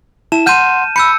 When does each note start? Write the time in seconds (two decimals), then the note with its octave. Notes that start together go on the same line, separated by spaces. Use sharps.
0.32 E4 A5 E7
0.46 F#5 C6 F6 G6 D#7
0.96 B5 E6 G6 C#7